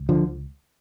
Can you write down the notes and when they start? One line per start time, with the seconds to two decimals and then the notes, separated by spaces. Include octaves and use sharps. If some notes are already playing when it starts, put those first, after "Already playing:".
Already playing: C#2
0.09 D3 F3